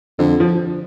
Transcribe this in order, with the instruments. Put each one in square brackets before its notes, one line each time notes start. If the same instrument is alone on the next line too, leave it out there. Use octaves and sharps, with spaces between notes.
[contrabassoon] F2 [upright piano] D3
[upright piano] F3